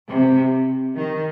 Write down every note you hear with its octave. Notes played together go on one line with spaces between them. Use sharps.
C3
D#3